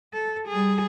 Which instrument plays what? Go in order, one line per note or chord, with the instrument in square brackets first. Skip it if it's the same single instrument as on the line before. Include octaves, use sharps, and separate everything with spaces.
[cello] A4
G3 G#4